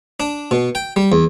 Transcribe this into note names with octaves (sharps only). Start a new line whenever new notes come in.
D4
B2
G5
G3
E2